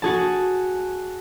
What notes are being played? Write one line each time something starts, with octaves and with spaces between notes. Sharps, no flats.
F#4 G#4 A5